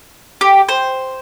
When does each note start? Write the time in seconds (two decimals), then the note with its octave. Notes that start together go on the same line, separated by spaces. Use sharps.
0.41 G4
0.69 C5